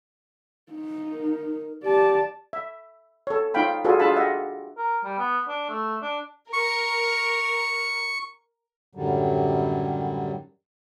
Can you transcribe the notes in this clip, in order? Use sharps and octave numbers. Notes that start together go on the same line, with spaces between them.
D#4
A#4
G4 D5 A5
E5
A4 C#5
D#4 F4 C#5 F5 G5 B5
F4 F#4 G#4 A4 B4 D5
D4 F4 G#4 E5 A5 B5
G4 D#5 E5 F#5
A#4
G3
B3
D4
A3
D4
A#4 C#6
F#2 A2 D3 D#3 F#3 G3